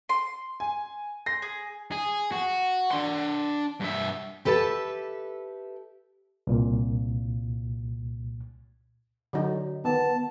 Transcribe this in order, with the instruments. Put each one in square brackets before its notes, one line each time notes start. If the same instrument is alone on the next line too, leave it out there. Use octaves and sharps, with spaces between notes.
[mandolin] C6
[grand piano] G#5
[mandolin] C6 [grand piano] A#6
[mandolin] G#4
[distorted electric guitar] G#4
F#4
D4 C6
G2 E5
[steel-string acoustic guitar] G4 A4 B4 E5 A5
[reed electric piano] C2 A#2
[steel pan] D3 F#3 D#4
[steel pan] D#3 [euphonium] B3 [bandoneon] A5